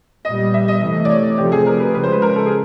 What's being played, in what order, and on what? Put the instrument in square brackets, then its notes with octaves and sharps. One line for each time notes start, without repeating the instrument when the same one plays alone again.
[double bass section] A#2 G3 B3 [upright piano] D#5
[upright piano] E5
D#5
[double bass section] C3 E3 A3 [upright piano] D#5
[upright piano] D5
C#5
[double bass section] C3 F3 A3 C4 [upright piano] G4
[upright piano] G#4
A#4
B4
[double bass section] C#3 F3 G#3 [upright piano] B4
[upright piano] C5
B4
A#4
A4
G#4